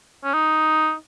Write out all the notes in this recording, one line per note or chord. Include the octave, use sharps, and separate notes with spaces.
C#4
D#4